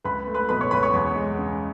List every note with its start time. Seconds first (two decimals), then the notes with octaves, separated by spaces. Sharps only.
0.04 C#2 B4 B5
0.27 A3
0.34 B4 B5
0.49 B2 B4 B5
0.61 C#5 C#6
0.71 C#2 B4 B5
0.83 C#5 C#6
0.93 E2
1.16 G#3
1.38 C#3